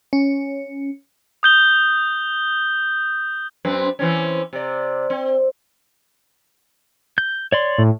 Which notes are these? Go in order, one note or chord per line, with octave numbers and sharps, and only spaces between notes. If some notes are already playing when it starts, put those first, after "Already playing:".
C#4
D#6 G6 G7
F#2 C4 B4
E3 C4 C#4
C3 D5
C4
G6
C#5 D5 C6
A2